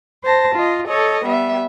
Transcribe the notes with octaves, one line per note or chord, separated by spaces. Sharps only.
C5 A5 A#6
F4 D#5
A4 C#5 D#5
G3 B3 E5